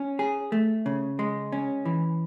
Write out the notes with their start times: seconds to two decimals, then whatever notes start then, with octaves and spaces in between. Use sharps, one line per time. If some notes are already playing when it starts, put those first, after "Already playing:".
Already playing: C#4
0.19 G#4
0.52 A3
0.86 C#3
1.19 G#3
1.52 C#4
1.85 E3